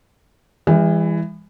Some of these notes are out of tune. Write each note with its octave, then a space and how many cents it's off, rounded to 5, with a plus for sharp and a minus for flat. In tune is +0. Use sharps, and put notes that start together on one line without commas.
E3 +10 G#3 -40